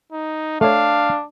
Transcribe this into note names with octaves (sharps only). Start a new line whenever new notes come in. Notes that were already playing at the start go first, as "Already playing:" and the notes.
D#4
A3 D4 C#5 F5